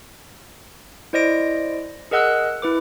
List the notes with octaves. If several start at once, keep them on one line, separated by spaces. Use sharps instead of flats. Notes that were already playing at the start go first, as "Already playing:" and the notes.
E4 C5 D5 D#5 A#6 D7
G#4 A#4 D#5 F#5 E6 F#6
E4 B4 D6